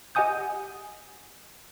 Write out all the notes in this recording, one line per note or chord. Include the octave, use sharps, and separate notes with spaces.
G4 D#5 F#5 G#5 D#6 G6